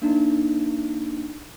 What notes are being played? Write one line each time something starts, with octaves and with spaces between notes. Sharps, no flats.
A#3 D4 D#4